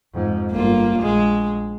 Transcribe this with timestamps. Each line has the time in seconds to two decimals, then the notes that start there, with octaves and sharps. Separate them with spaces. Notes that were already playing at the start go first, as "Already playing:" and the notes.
0.13 F2 G#2
0.52 G1 A#3 F4
1.02 A#1 G#3